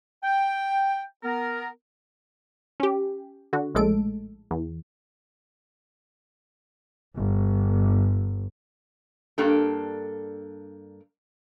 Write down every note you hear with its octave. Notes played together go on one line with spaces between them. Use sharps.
G5
B3 A#4
C#4 G4
D3 F#4
A#1 A2 G#3 A4 D7
E2
G1
G2 A#3 D4 G4 A4